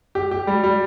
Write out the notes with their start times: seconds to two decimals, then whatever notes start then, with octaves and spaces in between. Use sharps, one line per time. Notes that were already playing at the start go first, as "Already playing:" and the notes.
0.15 G4
0.31 G4
0.47 G3
0.64 G3